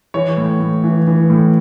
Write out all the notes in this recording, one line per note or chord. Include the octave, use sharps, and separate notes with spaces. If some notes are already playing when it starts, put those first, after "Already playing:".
E3 C#5
A2
A2
E3
E3
A2